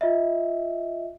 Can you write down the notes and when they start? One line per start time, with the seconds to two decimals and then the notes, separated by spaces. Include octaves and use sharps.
0.01 F4 D#5 E5